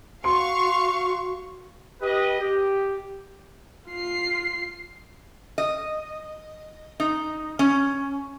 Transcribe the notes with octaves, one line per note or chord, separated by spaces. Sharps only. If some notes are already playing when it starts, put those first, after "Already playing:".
F#4 F5 C6 C#6
G4 B4 D#5
G4
F4 C7
D#5
D#4
C#4